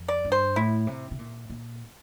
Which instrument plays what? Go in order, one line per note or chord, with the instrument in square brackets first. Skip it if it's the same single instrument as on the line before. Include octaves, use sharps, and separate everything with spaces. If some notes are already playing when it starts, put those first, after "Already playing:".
Already playing: [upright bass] F2
[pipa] D5
[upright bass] G2
[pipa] C5
[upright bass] A2 [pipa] E4
[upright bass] C3
C3
A#2
A#2